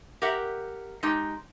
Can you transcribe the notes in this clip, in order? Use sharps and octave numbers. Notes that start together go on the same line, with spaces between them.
G4 A#4 E5 F#5
G#3 D#4 G4